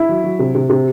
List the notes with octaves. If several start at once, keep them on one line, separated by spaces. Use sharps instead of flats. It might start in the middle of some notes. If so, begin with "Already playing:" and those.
Already playing: E4
F#3
F#3
C3
C3
C3